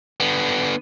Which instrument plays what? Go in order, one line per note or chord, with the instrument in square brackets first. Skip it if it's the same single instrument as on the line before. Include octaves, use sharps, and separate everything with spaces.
[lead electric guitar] D3 B3